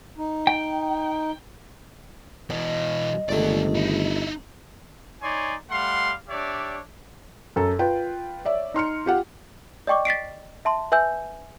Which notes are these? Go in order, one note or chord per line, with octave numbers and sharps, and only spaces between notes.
D#4
G5
B2 E3 D#5
G1 C#2 C3 D#3 A3 D5
D#4 E4
D#4 C#5 D5 G#5 C6
G3 A3 F5 F#5 C6
D4 G4 C#5 D5 E5
F#2 A4
F4 B4 G5
C#5 D5 E5
D#4 C6 F6 C#7
F4 G4 F#5
D5 D#5 G5 C#6 D6
A6 B6 C7 D7
E5 A5 C6
B4 E5 G#5 E6 G6